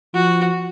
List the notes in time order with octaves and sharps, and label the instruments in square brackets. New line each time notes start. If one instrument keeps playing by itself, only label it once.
[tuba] F3 [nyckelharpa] F#4